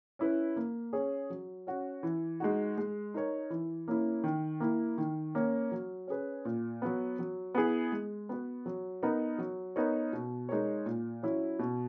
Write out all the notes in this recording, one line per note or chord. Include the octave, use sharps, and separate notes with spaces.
C#4 E4 B4
A#3
C#4 G#4 C#5
F#3
C#4 F#4
E3
G#3 D#4 F#4
G#3
D#4 A#4 C#5
E3
A#3 C#4 E4
D#3
A#3 E4
D#3
A#3 C#4
F#3
C#4 G#4 B4
A#2
F#3 B3
F#3
B3 E4 G#4
G#3
B3 F#4 B4
F#3
B3 D#4 A#4
F#3
B3 D#4 A#4 C#5
B2
G#3 D#4 A#4 C#5
A#2
F#3 C#4 E4
B2